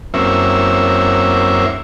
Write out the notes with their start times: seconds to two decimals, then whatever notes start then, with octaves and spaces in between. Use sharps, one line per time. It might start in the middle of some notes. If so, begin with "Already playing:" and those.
0.14 F#2 A#3 C4 C#4 E4 E5